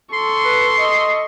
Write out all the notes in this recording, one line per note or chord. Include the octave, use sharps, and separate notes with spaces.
A4 C6 C#6
B4
D#5